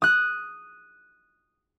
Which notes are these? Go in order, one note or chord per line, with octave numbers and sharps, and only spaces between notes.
D#6 F#6